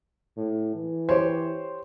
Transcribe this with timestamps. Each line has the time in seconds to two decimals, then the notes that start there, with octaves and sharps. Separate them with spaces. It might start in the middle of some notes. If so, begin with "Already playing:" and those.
0.37 A2
0.75 E3
1.09 G4 C5 C#5